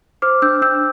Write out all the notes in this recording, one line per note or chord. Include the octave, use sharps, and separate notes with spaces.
C5 D6 F6
D4 E6 G6
D4 E6 G6